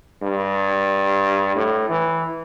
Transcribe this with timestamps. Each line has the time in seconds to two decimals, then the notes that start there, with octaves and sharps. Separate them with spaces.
0.22 G2
1.56 A2
1.90 E3